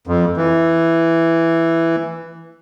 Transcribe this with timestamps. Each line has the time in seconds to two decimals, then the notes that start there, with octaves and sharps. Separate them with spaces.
0.07 F2
0.37 E3